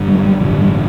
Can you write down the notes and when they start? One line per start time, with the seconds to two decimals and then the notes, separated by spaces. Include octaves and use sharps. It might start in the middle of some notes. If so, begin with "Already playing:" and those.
Already playing: G1 G2 D3
0.08 G3
0.25 G3
0.41 A1 G2 D3 E3
0.61 G3